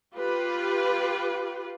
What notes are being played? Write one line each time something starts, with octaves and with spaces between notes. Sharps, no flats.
F4 G4 B4